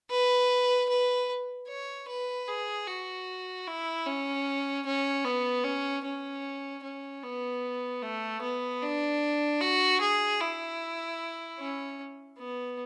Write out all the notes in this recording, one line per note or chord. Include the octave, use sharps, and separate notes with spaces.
B4
B4
C#5
B4
G#4
F#4
E4
C#4
C#4
B3
C#4
C#4
C#4
B3
A3
B3
D4
F#4
G#4
E4
C#4
B3